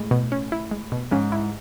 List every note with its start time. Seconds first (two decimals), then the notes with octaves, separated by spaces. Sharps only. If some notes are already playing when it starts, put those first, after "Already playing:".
Already playing: A2 G#3
0.11 B2
0.32 C#4
0.52 E4
0.71 G#3
0.92 B2
1.11 G#2 C#4
1.32 E4